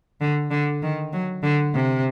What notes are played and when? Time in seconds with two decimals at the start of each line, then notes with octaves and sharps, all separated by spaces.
0.21 D3
0.51 D3
0.82 D#3
1.13 F#3
1.43 D3
1.74 C3